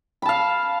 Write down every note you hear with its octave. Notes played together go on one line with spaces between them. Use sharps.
F5 A5 B5